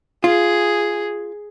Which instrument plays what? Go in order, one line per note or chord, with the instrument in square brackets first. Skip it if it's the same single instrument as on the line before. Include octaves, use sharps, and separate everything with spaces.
[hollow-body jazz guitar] F4 [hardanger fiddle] G#4